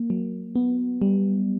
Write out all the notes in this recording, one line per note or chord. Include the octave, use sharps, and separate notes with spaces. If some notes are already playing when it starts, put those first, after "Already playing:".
Already playing: A#3
F#3
B3
G3